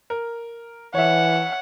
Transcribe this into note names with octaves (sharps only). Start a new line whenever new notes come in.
A#4
E3 C#5 E5 F#5